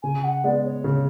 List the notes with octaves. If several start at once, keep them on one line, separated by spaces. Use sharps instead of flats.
C#3 G#5
F#5
G#3 B3 D5
C#5
C#3